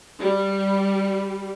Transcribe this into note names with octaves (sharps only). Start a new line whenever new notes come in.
G3